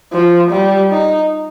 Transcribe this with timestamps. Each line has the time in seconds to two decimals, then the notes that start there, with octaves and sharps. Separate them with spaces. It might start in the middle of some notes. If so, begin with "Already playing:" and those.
0.13 F3
0.51 G3
0.91 D#4